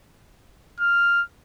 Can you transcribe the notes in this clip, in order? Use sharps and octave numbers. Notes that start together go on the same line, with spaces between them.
F6